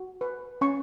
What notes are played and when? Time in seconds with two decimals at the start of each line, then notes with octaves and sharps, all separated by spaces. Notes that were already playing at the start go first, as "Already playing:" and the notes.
Already playing: F#4
0.21 B4
0.61 C#4 C#6